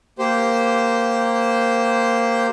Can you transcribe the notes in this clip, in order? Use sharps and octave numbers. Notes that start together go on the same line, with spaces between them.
A#3 G4 C5